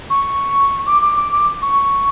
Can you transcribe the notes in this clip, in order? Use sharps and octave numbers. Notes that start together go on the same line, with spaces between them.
C#6
D6
D6
D6
D6
C#6